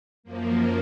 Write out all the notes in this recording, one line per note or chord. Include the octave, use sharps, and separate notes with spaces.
F#2 F3 A#3